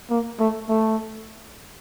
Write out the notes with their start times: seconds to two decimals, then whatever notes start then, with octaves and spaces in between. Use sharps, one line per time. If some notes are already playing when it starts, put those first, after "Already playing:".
0.10 A#3
0.39 A3
0.69 A3